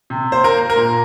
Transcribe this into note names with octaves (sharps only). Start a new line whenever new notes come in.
C3
A#3 C5
A#4
A#3
A#4
A#2